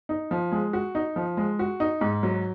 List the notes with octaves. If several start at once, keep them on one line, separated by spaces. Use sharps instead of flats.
D#4
F3
G#3
F#4
D#4
F3
G#3
F#4
D#4
G#2
F#3